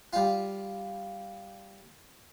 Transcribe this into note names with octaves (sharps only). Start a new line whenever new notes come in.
G3 F4